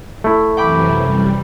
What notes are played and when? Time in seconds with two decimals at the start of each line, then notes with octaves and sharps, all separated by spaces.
0.24 A3 E4
0.57 F#2 C3 E3 G5 B5 D6
1.01 G3